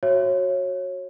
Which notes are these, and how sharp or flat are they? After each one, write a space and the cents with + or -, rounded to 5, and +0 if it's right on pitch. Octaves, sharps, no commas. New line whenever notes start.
F#4 +0 C#5 -25 E5 +25